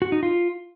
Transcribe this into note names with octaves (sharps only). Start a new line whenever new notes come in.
F#4
D#4
F4